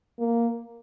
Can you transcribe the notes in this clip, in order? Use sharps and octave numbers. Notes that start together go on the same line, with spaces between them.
A#3